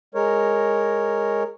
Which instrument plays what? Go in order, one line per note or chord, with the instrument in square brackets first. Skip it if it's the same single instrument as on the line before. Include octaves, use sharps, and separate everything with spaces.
[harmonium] G#3 A#4 C#5